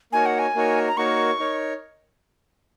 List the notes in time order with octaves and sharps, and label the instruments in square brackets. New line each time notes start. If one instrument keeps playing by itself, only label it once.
[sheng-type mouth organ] A#3 D#4 F#4 A#4 C#5 [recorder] G#5
[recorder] F#5
G#5
[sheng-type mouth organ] A#3 D#4 F#4 A#4 C#5
[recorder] A#5
[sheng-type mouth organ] A#3 D#4 F#4 A#4 C#5 [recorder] C#6
[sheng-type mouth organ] D#4 A#4 C#5